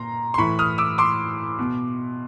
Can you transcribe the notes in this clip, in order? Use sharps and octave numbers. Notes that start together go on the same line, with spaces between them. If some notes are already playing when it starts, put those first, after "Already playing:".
Already playing: A#2 A#5 C6
C6
A2 E3 B5 C#6
D#6 F6
D6 E6
C6 D6
B2